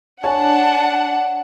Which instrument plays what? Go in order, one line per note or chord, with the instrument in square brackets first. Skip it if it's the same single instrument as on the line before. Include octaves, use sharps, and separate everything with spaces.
[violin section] D4 F#5 [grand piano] C#5 G#5 [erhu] A5